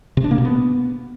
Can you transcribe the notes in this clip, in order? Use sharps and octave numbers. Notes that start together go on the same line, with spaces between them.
C3
D4
A#3
B2
B3